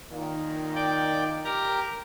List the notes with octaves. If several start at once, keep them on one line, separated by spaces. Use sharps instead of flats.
A#2 D#3
D5 G5
G4 A#4 A#5